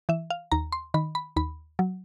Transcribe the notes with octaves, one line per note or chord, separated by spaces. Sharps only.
E3 E5
F5
D#2 A#5
C6
D#3 B5
B5
D#2 B5
F#3